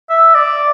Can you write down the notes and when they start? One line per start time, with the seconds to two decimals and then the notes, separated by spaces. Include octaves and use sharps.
0.10 E5
0.35 D5